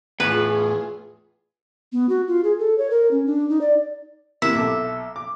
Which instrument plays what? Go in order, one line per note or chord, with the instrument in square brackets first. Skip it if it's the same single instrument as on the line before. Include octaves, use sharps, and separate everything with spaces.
[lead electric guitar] E2 A2 [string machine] F4 G#4 [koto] B4
[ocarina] B3
F#4
F4
G#4
A4
C#5
A#4
C#4
D4
D#4
D5
[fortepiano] C3 A#3 E4 [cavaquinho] E5
[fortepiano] B1 A4 D6
D6